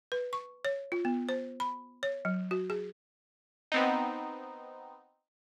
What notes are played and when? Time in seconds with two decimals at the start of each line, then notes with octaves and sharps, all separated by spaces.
0.12 B4
0.33 C#6
0.65 C#5
0.92 F4
1.05 B3
1.29 C5
1.60 B5
2.03 C#5
2.25 F#3
2.51 F#4
2.70 G#4
3.72 B3 C4 D#4